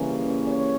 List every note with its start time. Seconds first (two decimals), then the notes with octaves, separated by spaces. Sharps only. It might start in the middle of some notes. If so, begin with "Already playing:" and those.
Already playing: C#3 E3 G3 A#3 C#4
0.47 C#5